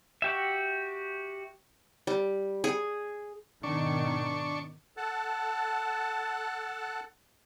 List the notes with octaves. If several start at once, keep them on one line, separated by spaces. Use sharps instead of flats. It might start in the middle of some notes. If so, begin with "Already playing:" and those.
F#4 G4 E5
G3
G#4
G#2 B2 D#3 D4 C#6
A4 F#5 A5